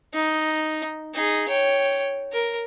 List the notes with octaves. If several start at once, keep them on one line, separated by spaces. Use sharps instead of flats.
D#4
D#4 G#4
C#5 G5
A#4